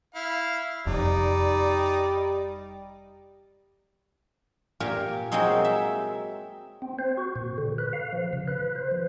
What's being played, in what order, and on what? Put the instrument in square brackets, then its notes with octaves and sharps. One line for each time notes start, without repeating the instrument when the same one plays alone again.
[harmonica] E4 F5
[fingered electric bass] F1 F2 [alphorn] G3 [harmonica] D#4 D5
[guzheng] A#2 F4 G4 A#4 G#5
F#3 G#3 A#3 C4 D#4 G#4
E5
[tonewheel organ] C4
C5
F#4
A#2
D3
B4
F5
F3
C#3
B4
C5
F3